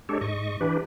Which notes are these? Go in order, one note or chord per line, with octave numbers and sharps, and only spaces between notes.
G#3 D4 G4 A4 C#5
G#2 D#5 C#6
E3 D4 G4 B4